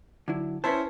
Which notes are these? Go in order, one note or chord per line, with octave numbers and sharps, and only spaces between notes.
D3 F#3 E4
C#4 E4 B4 C5 A5